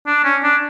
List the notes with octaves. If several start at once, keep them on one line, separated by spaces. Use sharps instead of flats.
D4
C#4
D4